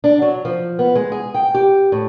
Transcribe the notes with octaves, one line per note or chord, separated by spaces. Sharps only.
D4
F#3
F3
B3
G#3
G#4
G5
G4
A2